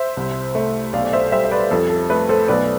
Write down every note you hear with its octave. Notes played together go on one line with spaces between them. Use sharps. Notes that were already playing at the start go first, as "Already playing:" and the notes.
Already playing: C5 E5
C2
A3
B1 D5 F5
D5
C5 E5
G3 C5 E5
E5
B4 D5
F2 A4
A4
A3 B4
A4 C5
B1 B4 D5